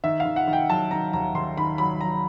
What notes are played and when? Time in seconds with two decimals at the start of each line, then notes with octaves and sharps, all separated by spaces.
0.04 D#3 E5
0.20 F5
0.25 D#3
0.36 F#5
0.47 D#3
0.53 G5
0.69 F#3 A5
0.91 D#3 A#5
1.13 D#2 A#5
1.35 D#2 C6
1.57 D#3 B5
1.78 F#3 B5
2.00 F#3 A#5